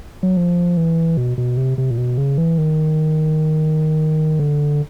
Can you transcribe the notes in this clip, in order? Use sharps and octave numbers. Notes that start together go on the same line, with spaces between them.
F#3
F3
E3
B2
B2
C3
C3
A#2
B2
C#3
E3
D#3
D3